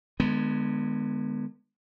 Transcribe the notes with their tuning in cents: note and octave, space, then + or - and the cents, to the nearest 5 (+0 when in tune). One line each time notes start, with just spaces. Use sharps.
D3 +40 G#3 +0 B3 +0